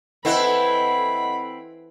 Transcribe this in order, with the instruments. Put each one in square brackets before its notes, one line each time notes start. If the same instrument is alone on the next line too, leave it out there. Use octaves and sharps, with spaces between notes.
[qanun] E3 [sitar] C4 E4 [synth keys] A4 D#5 F#5 [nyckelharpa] B5